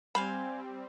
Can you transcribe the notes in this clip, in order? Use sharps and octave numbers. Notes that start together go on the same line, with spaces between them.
G3 C4 C5 F5 G#5 B5